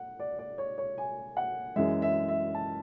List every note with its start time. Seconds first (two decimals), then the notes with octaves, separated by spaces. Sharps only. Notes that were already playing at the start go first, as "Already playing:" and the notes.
Already playing: F#5
0.19 D5
0.39 D5
0.58 C#5
0.78 C#5
0.98 G#5
1.37 F#5
1.76 F#2 E3 G#3 E5
2.02 E5
2.28 E5
2.55 A5